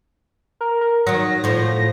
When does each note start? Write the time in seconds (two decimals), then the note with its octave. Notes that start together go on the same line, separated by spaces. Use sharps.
0.61 A#4
0.81 A#4
1.07 D#3 F#3 A#6
1.44 A2 F3